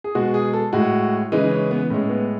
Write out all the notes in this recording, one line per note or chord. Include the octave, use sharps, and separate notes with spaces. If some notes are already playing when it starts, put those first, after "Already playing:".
G#4
B2 G#3 F#4
G#4
A4
A2 G#3 F#4
C#3 E3 G#3 D#4
C#4
B3
A2 G#3 C#4
B3